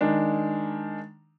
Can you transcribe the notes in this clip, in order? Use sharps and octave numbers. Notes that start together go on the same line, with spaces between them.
D#3 G#3 D4